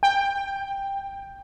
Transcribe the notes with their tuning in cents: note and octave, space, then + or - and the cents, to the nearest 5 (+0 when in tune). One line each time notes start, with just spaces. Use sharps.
G5 +10